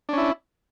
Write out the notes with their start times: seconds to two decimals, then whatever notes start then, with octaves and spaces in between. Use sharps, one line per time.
0.09 D4
0.13 C#4
0.18 E4